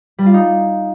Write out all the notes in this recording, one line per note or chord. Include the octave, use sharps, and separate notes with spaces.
G3
F4
D#4